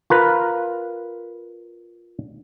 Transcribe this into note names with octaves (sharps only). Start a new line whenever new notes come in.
F4 A#4 B4